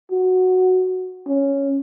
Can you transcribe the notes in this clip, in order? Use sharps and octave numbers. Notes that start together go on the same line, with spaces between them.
F#4
C#4